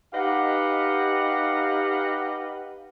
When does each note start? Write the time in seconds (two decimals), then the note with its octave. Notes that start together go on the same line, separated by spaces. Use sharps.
0.13 D#4 G4 B4 D#5 F5 F#5